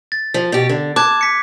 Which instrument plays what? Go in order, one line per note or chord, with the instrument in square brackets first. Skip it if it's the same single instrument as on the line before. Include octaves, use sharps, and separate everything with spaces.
[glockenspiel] A6
[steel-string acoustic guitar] F3
B2 G4
D3
[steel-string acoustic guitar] A5 [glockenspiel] D6 F#6 G#6
[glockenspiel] B6 C#7